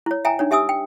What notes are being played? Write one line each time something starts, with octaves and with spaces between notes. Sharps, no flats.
E4 C#5
E5 G5 G#5 A#5
D4 D#4 C#5
G4 E5 G#5 D#6 E6
G5